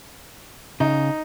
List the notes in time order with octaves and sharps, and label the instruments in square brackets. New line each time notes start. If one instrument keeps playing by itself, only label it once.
[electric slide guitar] C#3 [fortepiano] D#4